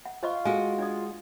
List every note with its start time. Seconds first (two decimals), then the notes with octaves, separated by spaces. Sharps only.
0.06 F#5
0.23 F4 C5 D#5 C#6
0.45 G#3 F#4 A4 F5 G#5
0.79 D4 D5 D#6